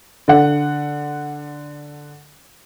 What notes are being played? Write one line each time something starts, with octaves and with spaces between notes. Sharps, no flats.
D3 F#5